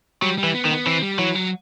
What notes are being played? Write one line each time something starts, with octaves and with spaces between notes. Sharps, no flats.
F#3 G3
G3
E3
B3
D#3
B3
E3 C4
G3
E3 F#3
F#3